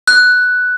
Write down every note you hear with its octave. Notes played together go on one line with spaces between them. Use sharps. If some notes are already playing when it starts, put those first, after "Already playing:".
F#6